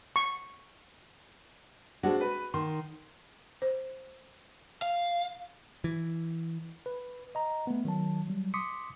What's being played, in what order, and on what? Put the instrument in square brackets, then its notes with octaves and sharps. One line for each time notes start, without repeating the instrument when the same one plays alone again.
[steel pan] C#6
[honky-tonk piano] G#3 C4 D4 [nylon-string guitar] F#4
[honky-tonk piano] B4
[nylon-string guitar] D#3 [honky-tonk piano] C6
[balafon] C5
[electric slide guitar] F5
[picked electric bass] E3
[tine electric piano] B4
D#5 A#5
A3 B3
D#3 F#3 A5
F#3 G3
C6 D6 D#6 B6 C#7